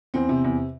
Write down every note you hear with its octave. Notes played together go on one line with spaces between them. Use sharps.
E2 C4
C3
E2